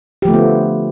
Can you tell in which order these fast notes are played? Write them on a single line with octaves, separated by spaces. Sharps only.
G4 F3 A3 D3 B3